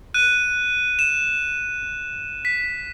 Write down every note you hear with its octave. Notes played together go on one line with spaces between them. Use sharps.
F#6 D#7
E7
B6